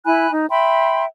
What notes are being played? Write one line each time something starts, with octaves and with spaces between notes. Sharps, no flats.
E4 G#5 B5 F#6
D#4
E5 G5 B5 C6